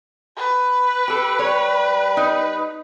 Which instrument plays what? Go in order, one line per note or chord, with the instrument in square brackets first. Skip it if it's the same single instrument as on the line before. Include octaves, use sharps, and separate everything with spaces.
[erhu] B4
[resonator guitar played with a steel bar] G4 A4
[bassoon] G3 [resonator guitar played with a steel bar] C#5
[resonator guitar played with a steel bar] D#4